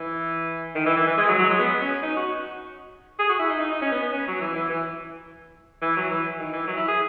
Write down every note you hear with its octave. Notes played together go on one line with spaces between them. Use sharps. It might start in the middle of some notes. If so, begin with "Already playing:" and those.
Already playing: E3
D#3
E3
E3
E3
G#3
F#3
F#3
G#3
B3
C#4
D#4
F#4
G#4
F#4
E4
D#4
D#4
D#4
C#4
B3
B3
C#4
F#3
E3
E3
E3
E3
F#3
E3
D#3
E3
F#3
E4
G#4